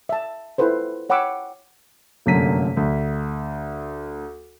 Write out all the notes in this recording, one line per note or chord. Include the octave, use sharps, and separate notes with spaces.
E5 A5
E4 F4 A4 B4 C5
C#5 F#5 G5 B5 D6 E6
F1 F#2 D3 A#3 B6 D#7
D2